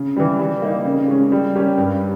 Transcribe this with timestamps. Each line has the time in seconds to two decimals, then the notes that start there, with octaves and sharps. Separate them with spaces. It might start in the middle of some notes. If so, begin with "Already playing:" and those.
Already playing: C#3
0.17 E3 G3
0.39 G3
0.62 A#3 D#4
0.85 C#3
1.08 G#3 C#4
1.32 G3
1.55 C#4 G4 A#4
1.78 G2